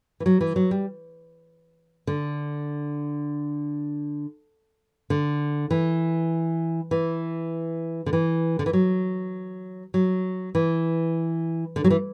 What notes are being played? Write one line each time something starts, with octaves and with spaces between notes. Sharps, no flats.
E3
F#3
E3
F#3
G3
D3
D3
E3
E3
D3
E3
D3
E3
F#3
F#3
E3
D3
F#3
E3